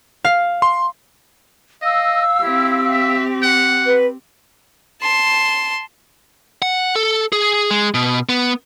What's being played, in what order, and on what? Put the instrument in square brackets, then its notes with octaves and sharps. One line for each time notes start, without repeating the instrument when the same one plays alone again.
[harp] F5
[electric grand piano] C6
[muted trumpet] D#5 [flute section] F5 E6
[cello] C4 G4 [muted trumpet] E4
[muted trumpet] E5
F#5
[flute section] B4
[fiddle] A5 C6
[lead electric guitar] F#5
A4
G#4
G#3
B2
B3